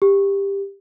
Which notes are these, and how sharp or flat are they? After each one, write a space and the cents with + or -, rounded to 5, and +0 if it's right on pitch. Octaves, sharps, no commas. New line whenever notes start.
G4 +15